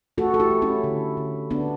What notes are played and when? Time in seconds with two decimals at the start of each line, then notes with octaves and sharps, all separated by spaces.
0.18 A3 F#4 A4
0.34 A4
0.40 E4 G4
0.50 A3
0.62 C#4 E4
0.84 D3
1.17 D3
1.51 D3 B3 D4